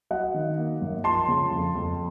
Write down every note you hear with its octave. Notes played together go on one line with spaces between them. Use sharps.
F#3 D#5 F#5
D#3
A#3
F#2
F3 A5 C6
C#3
F2
F2